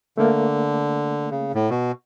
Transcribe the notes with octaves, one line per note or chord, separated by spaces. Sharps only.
D3 A3 A#3
C#3
A2
B2